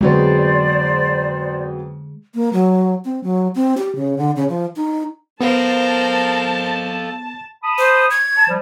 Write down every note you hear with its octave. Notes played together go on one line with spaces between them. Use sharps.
F2 D3 F#3 G#3 B3 C5 D5
A#3
F#3
C4
F#3
C4
G4
C#3
D3
C#3
F3
D#4
B3 A4 A#4 C5 F5 A5
A5 B5 D#6
C5
G#6
A5
F3 G3